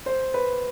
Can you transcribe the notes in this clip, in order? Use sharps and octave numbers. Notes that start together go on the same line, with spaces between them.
C5
B4